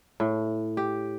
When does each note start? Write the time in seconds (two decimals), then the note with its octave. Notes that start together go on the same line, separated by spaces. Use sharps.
0.20 A2
0.77 G4